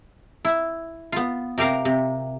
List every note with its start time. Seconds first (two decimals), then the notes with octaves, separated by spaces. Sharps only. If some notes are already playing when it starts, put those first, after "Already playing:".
0.45 E4
1.12 B3 F4
1.58 C3 G4 A#4 F5 A#5
1.85 C3